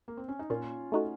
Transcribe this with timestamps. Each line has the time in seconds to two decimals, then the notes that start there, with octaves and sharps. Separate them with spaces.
0.08 A#3
0.17 C4
0.29 C#4
0.39 D#4
0.50 A#2 C#4 F4
0.92 A3 D#4 F#4